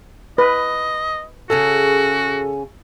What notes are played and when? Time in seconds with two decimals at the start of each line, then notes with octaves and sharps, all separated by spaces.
0.38 B4 D#5
1.50 C#3 C#4 F#4 G#4 A4